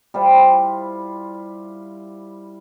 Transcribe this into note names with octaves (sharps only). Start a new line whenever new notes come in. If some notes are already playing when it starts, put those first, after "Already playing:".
G3 E4 F4 C5